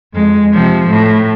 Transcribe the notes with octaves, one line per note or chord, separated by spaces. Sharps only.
F2 G#3
C3 F3
A2